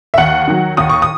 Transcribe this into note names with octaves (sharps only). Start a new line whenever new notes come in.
E5
D#2 F#5
D#3 F#3
D#2 D#6
C#6
D#6